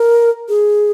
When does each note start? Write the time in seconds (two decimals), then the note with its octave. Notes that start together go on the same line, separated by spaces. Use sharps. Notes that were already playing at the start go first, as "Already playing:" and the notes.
Already playing: A#4
0.49 G#4